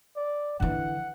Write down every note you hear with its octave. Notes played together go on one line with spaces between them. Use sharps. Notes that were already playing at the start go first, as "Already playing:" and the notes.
D5
D3 E3 F#5